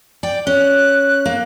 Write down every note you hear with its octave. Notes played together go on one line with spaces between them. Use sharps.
D5 G5
C#4 F#6
A#3